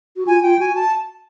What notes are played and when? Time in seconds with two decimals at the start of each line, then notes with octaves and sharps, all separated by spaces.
0.17 F#4
0.27 F4 G#5
0.42 F4 G5
0.59 F#4 G#5
0.75 A5